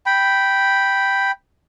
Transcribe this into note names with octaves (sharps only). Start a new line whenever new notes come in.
G5 B5